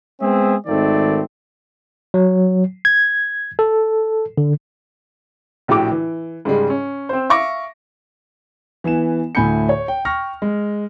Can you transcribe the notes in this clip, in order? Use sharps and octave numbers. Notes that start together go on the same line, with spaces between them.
G#3 B3 C4 G#4 E5
G#1 D#3 A3 C4 D5
F#3
G#6
A4
D3
A#1 A2 F#4 G4 D6
E3
G#2 C#3 G3 G#3
C#4
C4 C5
E5 F5 C#6 D6 A#6
E3 B3 G#5 E7
D2 A2 G#5 B5 G6 C#7
C#5
G5
G5 C#6 F6 A#6
G#3